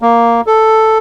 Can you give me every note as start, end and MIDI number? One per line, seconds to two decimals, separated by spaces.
0.02 0.41 58
0.47 0.98 69